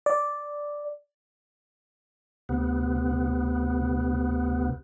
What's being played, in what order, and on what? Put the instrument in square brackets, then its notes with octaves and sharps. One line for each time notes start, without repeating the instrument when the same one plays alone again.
[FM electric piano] D5
[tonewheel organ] D2 C3 B3